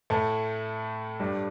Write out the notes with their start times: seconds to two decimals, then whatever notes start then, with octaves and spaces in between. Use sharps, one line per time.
0.10 A2 A3
1.20 G2 G3